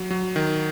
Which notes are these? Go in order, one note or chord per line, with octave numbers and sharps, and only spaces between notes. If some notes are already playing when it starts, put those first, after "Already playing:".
Already playing: F#3
F#3
D#3